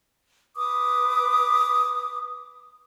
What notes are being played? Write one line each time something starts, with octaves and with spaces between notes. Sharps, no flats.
B4 D6 D#6